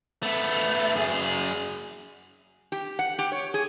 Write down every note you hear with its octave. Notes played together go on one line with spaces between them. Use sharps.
A3 B3
F#2 G#4
G4
F#5
G4
C#5
G#4